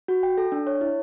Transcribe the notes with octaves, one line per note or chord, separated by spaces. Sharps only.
F#4
G5
A4
D4
C#5
E4